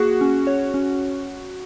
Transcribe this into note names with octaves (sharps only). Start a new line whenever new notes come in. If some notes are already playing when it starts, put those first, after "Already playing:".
Already playing: A#3 F#4 G#4
C#4
C#5
C#4